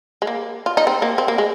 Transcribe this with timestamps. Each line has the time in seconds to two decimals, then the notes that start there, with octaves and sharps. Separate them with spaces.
0.22 G#3
0.27 A#3
0.66 F4
0.77 D#4
0.87 C4
1.02 A#3
1.18 C4
1.28 A#3
1.38 G#3